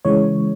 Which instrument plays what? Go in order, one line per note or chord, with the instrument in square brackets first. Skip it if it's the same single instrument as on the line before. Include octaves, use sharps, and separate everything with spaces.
[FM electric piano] C#3 E3 G#3 C#5